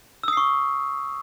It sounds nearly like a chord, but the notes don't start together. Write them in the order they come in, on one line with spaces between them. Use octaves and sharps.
E6 D#6 C7 C#6